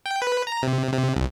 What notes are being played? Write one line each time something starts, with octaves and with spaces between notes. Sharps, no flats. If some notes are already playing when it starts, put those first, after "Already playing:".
G5
B4
A#5
C3
C3
C2